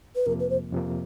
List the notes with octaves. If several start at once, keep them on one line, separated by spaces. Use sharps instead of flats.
B4
F2 C3 F3 A#3 A#4
B4
C5
F2 C3 F3 A#3